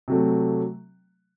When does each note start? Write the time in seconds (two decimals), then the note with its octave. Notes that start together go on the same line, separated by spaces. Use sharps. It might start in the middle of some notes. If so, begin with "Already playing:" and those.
0.08 C3 F#3 A3